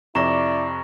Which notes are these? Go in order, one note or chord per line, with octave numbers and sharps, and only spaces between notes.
F2 C3 E4 D5 A#5 C#6 A#6